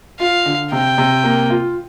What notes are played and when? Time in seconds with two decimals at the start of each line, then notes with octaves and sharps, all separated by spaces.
0.20 F4 F5
0.46 D3
0.72 C3 G5
0.98 C3
1.24 A#3
1.50 F4